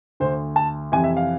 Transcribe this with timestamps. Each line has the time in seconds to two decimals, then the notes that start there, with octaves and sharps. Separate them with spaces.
0.20 D2 D3 C5
0.56 A5
0.92 F2 C3 E3 G#5
1.04 E5
1.17 F5